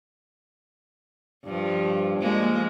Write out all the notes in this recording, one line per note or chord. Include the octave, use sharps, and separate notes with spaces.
G2 F3
F3 G#3 A#3